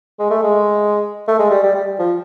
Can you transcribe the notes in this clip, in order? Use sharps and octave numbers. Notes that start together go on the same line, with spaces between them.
G#3
A3
G#3
A3
G#3
G3
G3
G3
F3